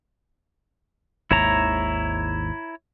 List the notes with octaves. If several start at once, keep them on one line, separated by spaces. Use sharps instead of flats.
G#1 D#2 G#2 E4 C#5 A#5